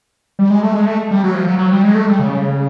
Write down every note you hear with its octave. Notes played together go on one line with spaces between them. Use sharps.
G3
G#3
A3
G#3
A3
G3
F#3
F3
F#3
F#3
G3
G#3
A3
G3
C#3